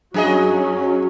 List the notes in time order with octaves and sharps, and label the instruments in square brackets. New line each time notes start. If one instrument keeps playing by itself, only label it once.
[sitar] F#2 G#4 D#5 [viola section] F#3 C#4